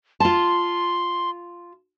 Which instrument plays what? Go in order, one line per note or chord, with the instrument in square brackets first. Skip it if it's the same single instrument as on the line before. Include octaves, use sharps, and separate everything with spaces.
[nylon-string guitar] F4 A5 [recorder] C6